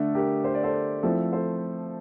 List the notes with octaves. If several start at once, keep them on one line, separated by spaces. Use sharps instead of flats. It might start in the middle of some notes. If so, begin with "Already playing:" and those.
Already playing: D3 A3 D4 A4
G4 A#4
C5
D5
A4 C5
F3 A3 C4 E4 A4
A4 C5